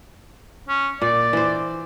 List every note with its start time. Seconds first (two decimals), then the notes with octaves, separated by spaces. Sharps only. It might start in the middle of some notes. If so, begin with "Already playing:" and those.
0.69 C#4
1.02 A#2 D5
1.33 E3 C5